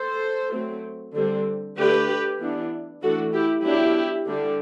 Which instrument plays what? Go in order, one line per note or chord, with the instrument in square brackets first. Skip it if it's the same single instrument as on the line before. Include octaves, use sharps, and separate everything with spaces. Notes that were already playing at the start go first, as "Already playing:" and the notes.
Already playing: [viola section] A4 C5
F#3 A3 C4
D3 G3 C4
D3 A3 D4 G4 B4
E3 B3 D4
E3 A3 D4 F#4 A4
E4 G4
F#3 B3 D4 E4 G4
D3 G3 D4